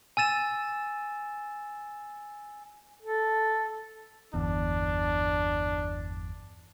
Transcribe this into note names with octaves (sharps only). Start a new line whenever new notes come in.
G#5 E6 A6 E7
A4
G1 E2 D4